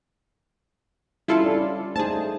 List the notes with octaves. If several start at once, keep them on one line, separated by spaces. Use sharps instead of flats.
G3 C#4 E4 F4 A4 F5
D4 D5
A3 D#4 G#4 C5 A5